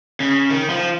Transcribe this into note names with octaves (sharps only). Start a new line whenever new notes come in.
C#3
D#3
F3